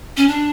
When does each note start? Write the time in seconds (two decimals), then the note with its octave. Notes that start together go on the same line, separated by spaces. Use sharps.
0.17 C#4
0.28 D4